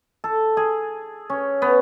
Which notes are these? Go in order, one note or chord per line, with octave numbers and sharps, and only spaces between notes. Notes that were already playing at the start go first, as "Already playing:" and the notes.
A4
G#4
C#4
B3